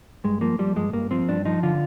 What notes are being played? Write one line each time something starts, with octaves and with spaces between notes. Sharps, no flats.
G2 G#3
F3 A#3
F3 G3
G2 G#3
G2 A#3
F3 C4
G2 D4
F3 D#4
D3 F4